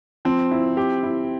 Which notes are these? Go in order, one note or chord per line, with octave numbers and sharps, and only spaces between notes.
F3 C4
E4
G4
E4